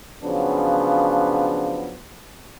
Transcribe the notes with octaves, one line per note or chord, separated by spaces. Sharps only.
C#3 F3 F#3 B3 D4